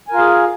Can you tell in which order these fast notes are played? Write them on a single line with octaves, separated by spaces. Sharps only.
G#5 A#4 F4 F5 G#4